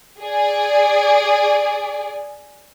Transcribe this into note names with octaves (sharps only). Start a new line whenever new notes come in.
G#4 D5